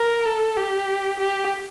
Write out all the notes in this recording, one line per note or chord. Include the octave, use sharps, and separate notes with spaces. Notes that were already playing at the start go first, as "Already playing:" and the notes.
Already playing: A#4
A4
G4
G4